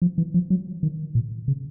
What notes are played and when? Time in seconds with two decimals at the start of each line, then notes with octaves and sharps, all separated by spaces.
0.02 F3
0.18 E3
0.34 F3
0.50 F#3
0.83 D#3
1.15 A#2
1.48 C#3